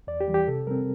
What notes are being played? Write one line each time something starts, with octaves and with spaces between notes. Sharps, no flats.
E2 D5
G4
E3 G3
G4
C3 A4
G3 C4 A#4